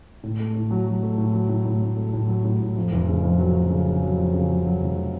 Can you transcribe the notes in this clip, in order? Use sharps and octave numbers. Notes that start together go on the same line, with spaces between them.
A2
A3
A2
F#3
F#3
A3
A2
F#3
A2
A2
A2
A3
A2
F#3
A2
A2
F2
F1
C#3
F2
F#3
F#3
C#3
C#3
F#3
F2
C#3
F#3
F#3
F1